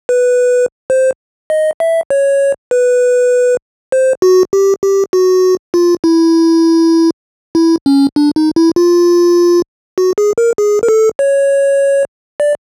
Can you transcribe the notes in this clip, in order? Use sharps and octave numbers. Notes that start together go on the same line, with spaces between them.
B4
C5
D#5
E5
C#5
B4
C5
F#4
G4
G4
F#4
F4
E4
E4
C#4
D4
D#4
E4
F4
F#4
G#4
A#4
G#4
A#4
A4
C#5
D5